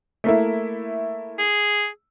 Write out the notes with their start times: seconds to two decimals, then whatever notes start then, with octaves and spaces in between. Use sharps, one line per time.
0.24 A3 A#3 E4
1.39 G#4